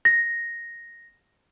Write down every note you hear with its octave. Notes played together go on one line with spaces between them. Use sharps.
A#6